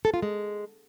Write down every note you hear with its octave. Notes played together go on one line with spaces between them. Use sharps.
A4
F4
G#3